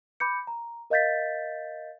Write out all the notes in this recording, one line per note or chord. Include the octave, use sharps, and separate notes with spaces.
B5 D6 G6 C#7
A#5
A#4 D#5 F5 G6 A6 B6